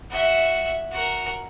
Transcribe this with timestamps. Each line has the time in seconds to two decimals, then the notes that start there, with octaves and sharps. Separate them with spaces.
0.11 F#4 E5
0.92 F#4 A#4